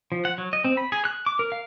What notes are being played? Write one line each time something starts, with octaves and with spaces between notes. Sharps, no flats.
F3
F#5
F#3
D#5
C4
B5
G#4
F#6
D6
A#4
F5